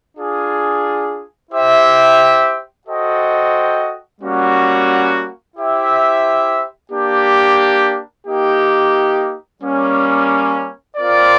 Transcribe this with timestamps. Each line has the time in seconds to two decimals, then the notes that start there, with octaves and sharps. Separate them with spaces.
0.16 D4 F4 G#4
1.51 E4 G4 C5 E5 G5
2.86 F#4 A4 C5 D#5 G5
4.21 G3 A#3 C#4 F#4
5.56 E4 G4 C5 E5
6.92 A#3 D4 G4
8.26 A#3 D#4 G4
9.62 G3 A#3 C#4
10.97 C4 F4 A#4 D5